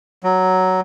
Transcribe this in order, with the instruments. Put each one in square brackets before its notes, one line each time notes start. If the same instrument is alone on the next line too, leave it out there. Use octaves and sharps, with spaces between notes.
[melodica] F#3